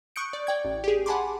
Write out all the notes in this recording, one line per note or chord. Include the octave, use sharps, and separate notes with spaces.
C#6 D#6 F#6 G6 C#7 D7
D5
D5 G5 G#6
A1
G4 G#4
F#5 G#5 A5 B5 C6 D6